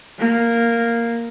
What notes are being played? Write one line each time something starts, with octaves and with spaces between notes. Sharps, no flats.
A#3